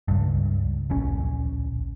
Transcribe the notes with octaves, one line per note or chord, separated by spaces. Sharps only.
C#2 G2
D1 A#1 C#4